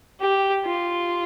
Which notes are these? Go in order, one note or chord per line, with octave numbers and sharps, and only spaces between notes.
G4
F4